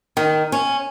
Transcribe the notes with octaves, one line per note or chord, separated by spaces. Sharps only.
D#3
C#4